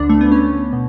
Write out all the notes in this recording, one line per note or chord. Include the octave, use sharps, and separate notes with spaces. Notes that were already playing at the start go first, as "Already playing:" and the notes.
Already playing: D2 D3 D4
A3
B3
C#4
B2